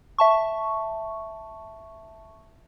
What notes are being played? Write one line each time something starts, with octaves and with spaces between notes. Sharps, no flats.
E5 A5 C#6